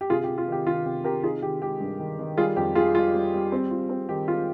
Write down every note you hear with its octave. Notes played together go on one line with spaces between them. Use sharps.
G4
C3 F4 G#4
G4
C3
F4
D#3 G4
D#3 F4
C3 G4
C3 G4 A#4
D#4 F4 G#4
D#3 G4
G#3 G4
G2
D#3
D#3
G3 F4 G#4
F2 G4
G3 F4 G#4
G3 F4
G3
G3
C4
F4
C4
D#3 G4
G#3 F4